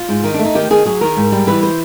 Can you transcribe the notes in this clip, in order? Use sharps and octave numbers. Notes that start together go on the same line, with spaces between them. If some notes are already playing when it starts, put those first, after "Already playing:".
Already playing: F4
G#2
D#3 D#4
A3 D4
D#4
D#3 G4
D#3 G#4
F#3 G#4
D#3 A#4
G#2
G3
E3 B4
C5